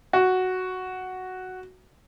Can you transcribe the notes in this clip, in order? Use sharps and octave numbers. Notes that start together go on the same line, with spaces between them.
F#4